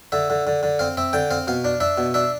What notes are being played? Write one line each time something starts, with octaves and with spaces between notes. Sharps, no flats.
D3 E5
D3
D3
D3
C4 F5
C4 E5
D3 G5
C4 F5
B2 F5
D4
D4 E5
B2
D4 E5